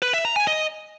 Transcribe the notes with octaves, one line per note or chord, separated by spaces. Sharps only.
B4
E5
A#5
G#5
D#5